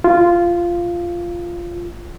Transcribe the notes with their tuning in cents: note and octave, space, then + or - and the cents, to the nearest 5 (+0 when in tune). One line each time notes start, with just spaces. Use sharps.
F4 -10